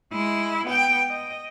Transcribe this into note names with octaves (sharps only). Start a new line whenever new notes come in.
G#3 E4
B3 G5
D#5